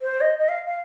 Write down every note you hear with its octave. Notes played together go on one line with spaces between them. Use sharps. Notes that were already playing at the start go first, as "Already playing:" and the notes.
C5
D#5
D#5
F5
F5